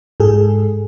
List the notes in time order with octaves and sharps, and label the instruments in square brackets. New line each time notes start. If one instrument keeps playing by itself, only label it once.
[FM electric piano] G#2 G#3 G#4 A4